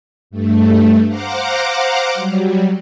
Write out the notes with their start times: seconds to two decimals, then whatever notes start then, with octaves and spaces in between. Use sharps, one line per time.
0.31 G2 A3
1.09 C5 F5 F#5 A#5 D6
2.14 F#3 G3